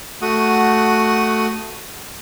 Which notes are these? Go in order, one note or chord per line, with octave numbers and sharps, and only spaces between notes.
A3 F#4 F#5 D#6